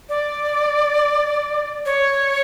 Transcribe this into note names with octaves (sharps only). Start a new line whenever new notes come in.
D5
C#5